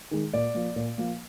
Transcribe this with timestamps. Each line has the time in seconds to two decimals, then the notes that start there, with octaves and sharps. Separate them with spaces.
0.11 D#3 G#3
0.33 A#2 D5
0.54 F3 A#3
0.76 A#2
0.98 F3 A#3